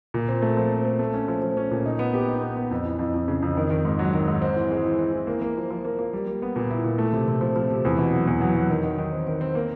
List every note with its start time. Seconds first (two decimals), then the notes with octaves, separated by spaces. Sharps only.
0.14 A#2
0.29 C4
0.42 A3
0.57 F3
0.71 C4
0.85 A3
0.99 A3
1.14 C#4
1.28 F3
1.42 F3
1.57 C#4
1.71 A#2
1.86 D#4
1.99 B3
2.14 G4
2.28 D#4
2.42 B3
2.57 B3
2.71 F2
2.85 E3
2.99 F2
3.14 F2
3.28 C#3
3.42 F2
3.57 D#3
3.70 D#3
3.85 G#2
3.99 F#3
4.14 D#3
4.28 G#2
4.42 C4
4.56 E3
4.71 G#3
4.85 E3
4.99 C4
5.13 E3
5.27 A#3
5.42 A#3
5.57 F3
5.71 F3
5.85 A#3
5.99 A#3
6.13 G3
6.27 G3
6.42 B3
6.56 A#2
6.70 E4
6.84 A#2
6.98 A3
7.13 C3
7.27 C3
7.41 F3
7.56 F3
7.70 C3
7.85 E2
7.99 B2
8.13 F#3
8.27 E2
8.41 F#3
8.55 F#3
8.70 D#3
8.84 D#3
8.98 D#3
9.12 C4
9.27 D#3
9.41 C4
9.55 A#3